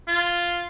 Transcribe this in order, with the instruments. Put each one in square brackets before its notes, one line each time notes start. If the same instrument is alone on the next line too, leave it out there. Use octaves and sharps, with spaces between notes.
[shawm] F4